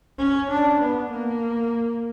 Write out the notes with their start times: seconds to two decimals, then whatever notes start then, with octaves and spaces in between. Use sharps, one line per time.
0.18 C#4
0.50 D4
0.79 B3
1.11 A#3